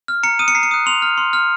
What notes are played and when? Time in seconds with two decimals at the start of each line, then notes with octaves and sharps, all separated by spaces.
0.08 F6
0.23 A#5 C#7
0.39 D#6 F#6 D#7
0.48 C#7
0.55 A#5 C7
0.63 C#7
0.71 D#6 F#6
0.86 C6 F7
1.02 F6
1.18 C6
1.33 F6